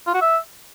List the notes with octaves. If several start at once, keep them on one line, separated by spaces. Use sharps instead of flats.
F4
F#4
E5